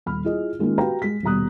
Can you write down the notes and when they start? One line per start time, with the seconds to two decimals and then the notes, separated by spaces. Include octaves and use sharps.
0.06 D#1 B5 F6
0.25 E4 F4 G#4 D#5
0.59 D#3 G#3 A#3 C#4 F4
0.78 F#4 G4 B4 F5 G5 A#5
1.02 G#3 B6
1.23 D#1 B2 G3 A#5 D#6 F#6